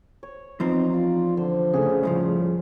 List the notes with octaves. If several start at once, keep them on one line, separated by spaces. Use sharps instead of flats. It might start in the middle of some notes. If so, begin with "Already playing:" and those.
C#5
E2 F3 C4 D#4
F4 D5
D3 C5
C#3 A3 G#4
C2 F2 A2 F3